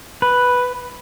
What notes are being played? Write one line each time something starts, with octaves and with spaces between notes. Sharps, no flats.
B4